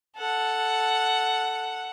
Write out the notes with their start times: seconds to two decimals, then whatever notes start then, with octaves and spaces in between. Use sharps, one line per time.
0.17 A4 F#5